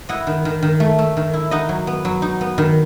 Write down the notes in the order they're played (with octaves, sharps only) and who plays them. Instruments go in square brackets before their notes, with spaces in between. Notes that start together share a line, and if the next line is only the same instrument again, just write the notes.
[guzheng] E4 D#5 F#5
D#3
D#3
D#3
A3
A3
D#3
E4
D#4 D#5 F#5
F#3
B3
F#3
D#4
B3
D#3